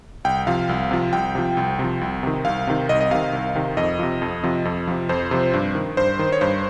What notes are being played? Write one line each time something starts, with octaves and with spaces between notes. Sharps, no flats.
C2 G5
C3 F3 F5
C2
C3 F3
C2 G5
C3 F3
C2
C3 F3
C2
C3 D#3
C2 F5
C3 D#3
C2 D#5
D#5
C3 D#3 F5
C2
C3 D#3
F2 D#5
C3 F3
F2
C3 F3
F2
C3 F3
F2 C5
C3 F3
G2
D#3
G2 C5
D#3
C#5
G2 C5